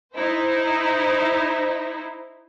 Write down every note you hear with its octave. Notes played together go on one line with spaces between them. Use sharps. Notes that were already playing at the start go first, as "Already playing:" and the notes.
D#4 E4 C5